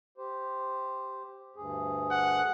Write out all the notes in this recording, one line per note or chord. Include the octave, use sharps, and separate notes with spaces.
G4 C5
D2 G2 G#4
F#5